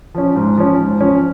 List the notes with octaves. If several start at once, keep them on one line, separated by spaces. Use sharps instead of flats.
F3 C#4
G#2
F3 C#4
G#2
F3 C#4